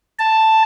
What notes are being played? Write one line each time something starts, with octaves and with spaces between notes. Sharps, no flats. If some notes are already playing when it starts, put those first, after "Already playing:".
A5